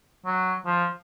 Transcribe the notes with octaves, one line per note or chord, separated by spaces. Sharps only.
F#3
F3